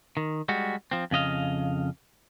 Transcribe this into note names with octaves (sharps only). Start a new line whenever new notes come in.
D#3
G3 G#3 F#4
F3 C4
F2 C#3 D#5 F5